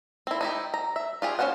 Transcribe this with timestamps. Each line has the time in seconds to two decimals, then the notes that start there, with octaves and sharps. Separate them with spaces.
0.27 C4 E4
0.41 D#4 E4 G4
0.74 A#5
0.96 E5
1.22 F4 G4 G#4
1.39 C#4 G#4 C5 F5 F#5